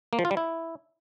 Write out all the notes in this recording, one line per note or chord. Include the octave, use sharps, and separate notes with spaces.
A#3
F3
F4
G3
E4